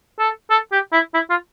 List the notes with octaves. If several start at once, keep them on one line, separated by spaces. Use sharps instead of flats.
A4
A4
G4
E4
E4
F4